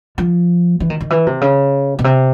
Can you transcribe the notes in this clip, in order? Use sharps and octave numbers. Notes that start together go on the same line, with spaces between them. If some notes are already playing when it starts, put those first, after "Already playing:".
F3
E3
D#3
D#3
E3
C3
C#3
B2
C3